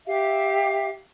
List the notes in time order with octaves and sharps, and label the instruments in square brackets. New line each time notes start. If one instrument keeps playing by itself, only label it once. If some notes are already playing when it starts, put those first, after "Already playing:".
[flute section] G4 E5 F5